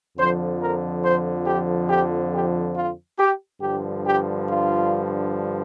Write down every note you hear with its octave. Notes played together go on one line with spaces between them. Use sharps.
F2 D3 F3 C5
A#4
C5
G4
G4
G4
F4
G4
G2 D3 F3 G4
G4
F4